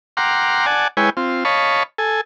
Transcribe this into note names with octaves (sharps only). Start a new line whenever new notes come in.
F#5 G5 A#5 C6 D6 F6
D5 F#5 G#5 A5
G#3 E4 B4 C#5 G5 G#5
C4 F4
C#5 D#5 F5 A5 B5 C#6
A4 G#5